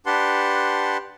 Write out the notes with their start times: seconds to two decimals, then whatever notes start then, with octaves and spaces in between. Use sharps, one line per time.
0.06 D4 G4 B4 F#5 A5 C6